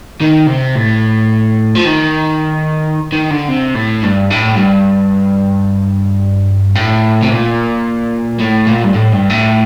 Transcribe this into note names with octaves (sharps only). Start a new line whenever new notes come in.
D#3
C3
A2
F3
D#3
D#3
D3
C3
A2
G2
A2
G2
A2
C3
A#2
A2
A#2
G2
A2
G2
A2